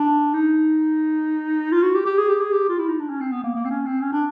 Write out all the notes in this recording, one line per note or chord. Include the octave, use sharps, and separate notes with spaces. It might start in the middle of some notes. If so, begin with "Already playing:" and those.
Already playing: D4
D#4
F4
F#4
G4
G4
G#4
G4
G#4
G4
F4
E4
D#4
D4
C#4
C4
B3
A#3
A#3
C4
C#4
C4
C#4
D4